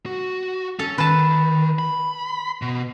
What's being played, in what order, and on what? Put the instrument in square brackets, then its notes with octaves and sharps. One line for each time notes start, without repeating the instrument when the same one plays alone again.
[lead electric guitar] F#4
[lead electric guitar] C#4 [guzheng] A4
[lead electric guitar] D#3 [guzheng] B4 A5
[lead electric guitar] B5
B2